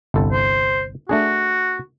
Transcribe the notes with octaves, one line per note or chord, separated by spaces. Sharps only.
G1 C2 A4
C5
A3 D4 F#4 G#4